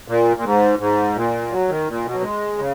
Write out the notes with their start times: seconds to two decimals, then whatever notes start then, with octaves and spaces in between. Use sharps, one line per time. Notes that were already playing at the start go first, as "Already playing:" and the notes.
0.08 A#2
0.37 A#2
0.44 G#2
0.79 G#2
1.16 A#2
1.52 F#3
1.69 D#3
1.88 A#2
2.05 B2
2.15 F#3
2.23 G#3
2.59 C#3